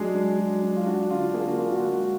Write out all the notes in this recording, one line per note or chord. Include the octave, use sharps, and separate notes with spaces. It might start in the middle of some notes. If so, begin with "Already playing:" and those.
Already playing: F#3 G#3 D4 G#4
D4
F#3
D4
F4
D4 F#4
D3 F4
A#3 G#4
F#4
A#3 F4
F#4
F4
G#3 F#4